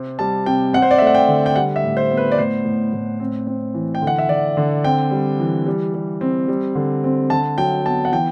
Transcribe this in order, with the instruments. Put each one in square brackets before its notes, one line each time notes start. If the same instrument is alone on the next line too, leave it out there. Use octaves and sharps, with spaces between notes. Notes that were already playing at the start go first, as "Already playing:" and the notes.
Already playing: [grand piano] C3 C4
G3 A5
C3 G5
C4 F#5
C5
D5
E5
A3
F#5
G5
D3
G5
G3 F#5
E5
A2
C5
B3
B4
D5
A2 C5
A2
A2
C4
C4
E3
G5
D3
F#5
E5
D3 D5
D3
C4 G5
G3
E3
G3
G3
C4
G3
D3
C4
D3 A5
F#3 G5
B3 A5
F#5
E3 G5